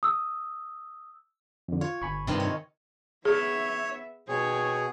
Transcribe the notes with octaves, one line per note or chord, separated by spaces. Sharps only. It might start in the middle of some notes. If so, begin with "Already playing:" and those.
D#6 E6
F2 D3
F4 C#5
G1 G#5 B5 C#6
G2 C3 D#3 F4
C#5
B3 G#4 C#5 E5
B2 G#4 C#5 G5